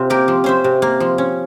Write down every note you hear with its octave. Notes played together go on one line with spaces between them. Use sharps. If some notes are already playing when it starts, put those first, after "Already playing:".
Already playing: C3 C#4 F4
A#3 G4 A#4
F3
C#4 C5 E5
C3
A#3
F3
C#4